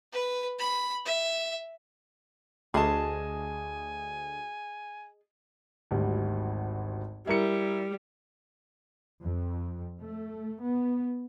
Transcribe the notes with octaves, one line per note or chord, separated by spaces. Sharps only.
B4
B5
E5
D2 G#4 D#5 G#5 A5
G#1 D2 G3
G3 E4 A#4 C#7
F2
A3
B3